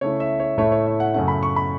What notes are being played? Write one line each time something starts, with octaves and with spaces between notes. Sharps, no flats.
C#3 A3 E4 C#5
E5
C#5
A2 A3 E4 C#5
C#5
E5
F#5
F#2 C#3 A3 C#4 F#5
B5
C#6
B5